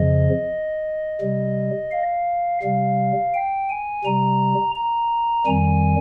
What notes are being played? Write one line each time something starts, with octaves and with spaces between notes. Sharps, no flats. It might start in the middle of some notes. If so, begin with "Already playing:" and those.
Already playing: F2 C#3 F3 D#5
C3 G3
F5
C3 G3 F5
G5
G#5
C3 G3 A#5
A#5
F2 D#3 G3 G#5